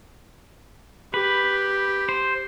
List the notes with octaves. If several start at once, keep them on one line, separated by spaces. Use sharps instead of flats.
G4 B4
C5